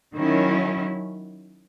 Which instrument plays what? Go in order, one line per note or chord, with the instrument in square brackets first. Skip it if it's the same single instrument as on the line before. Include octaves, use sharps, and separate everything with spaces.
[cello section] D#3 F#3 C#4 E4